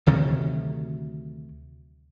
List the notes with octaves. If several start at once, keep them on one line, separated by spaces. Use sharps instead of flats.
D2 C3 D#3 F#3